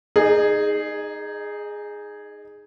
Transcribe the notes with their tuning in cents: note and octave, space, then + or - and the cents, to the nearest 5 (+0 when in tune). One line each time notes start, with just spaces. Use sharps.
D#4 +0 G#4 +0 D#5 -45